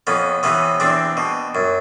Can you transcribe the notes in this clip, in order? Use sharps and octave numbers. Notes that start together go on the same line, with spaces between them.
F2 B3 C#4
C3 E3 B3 C#4
E2 C4 D4
B2
F#2